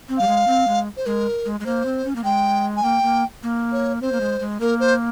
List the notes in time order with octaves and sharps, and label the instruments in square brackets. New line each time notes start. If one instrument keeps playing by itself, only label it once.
[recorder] C4
[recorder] G3 [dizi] F5
[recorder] G#3
C4
G#3
[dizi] C5
[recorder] G#3 [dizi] A#4
[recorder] G#3
G#3
[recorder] A#3 [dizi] C5
[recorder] C4
C#4
A#3
[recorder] G#3 [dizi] G5
[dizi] G#5
[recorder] A#3 [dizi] G5
[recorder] A#3
A#3
[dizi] C#5
[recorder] C4 [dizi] C5
[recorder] A#3
G#3
G#3
[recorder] A#3 [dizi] A#4
[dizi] C5